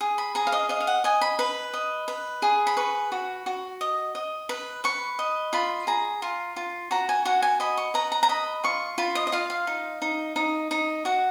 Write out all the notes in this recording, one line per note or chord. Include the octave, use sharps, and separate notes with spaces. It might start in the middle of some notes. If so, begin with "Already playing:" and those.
G#4
B5
G#4 A#5
F5
D#5
D#5 F5
F5
F#5
D#5 G#5
B5
B4 B5
D#5
B4
G#4
B5
B4 C#6
F#4
F#4
D#5
D#5
B4
B4 C#6
D#5
F4 B5
G#4 A#5
F4
F4
F#4 A#5
G#5
F#4 F#5
G#5
D#5 B5
C#6
B4 A#5
A#5
A#5
D#5 B5
F4 C#6
F4 B5
D#5
D#5
F4 F5
F5
D#4
D#4
D#4
D#4
F#4 F#5